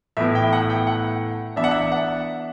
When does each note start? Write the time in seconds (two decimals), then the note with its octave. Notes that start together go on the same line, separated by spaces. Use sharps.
0.17 A2 E3 B3 E4 E5
0.35 G5
0.53 F#5
0.70 G5
0.87 F#5
1.56 E3 B3 D4 E5
1.64 F#5
1.71 E5
1.92 F#5